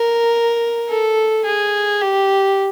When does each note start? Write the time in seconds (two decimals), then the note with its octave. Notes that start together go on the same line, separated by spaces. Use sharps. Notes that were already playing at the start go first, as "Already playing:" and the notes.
Already playing: A#4
0.89 A4
1.45 G#4
2.01 G4